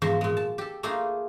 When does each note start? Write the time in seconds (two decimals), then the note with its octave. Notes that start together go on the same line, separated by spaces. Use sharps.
0.02 E2 G#2 F3 F#4 C5
0.21 A#2 G#3
0.37 A5
0.58 G4 A4
0.83 A3 A#3 D4 D#4 F4 G#4